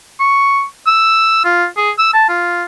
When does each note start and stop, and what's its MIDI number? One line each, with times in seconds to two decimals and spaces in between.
0.20 0.63 85
0.87 1.40 88
1.45 1.66 65
1.77 1.91 68
1.99 2.13 88
2.13 2.25 81
2.29 2.64 65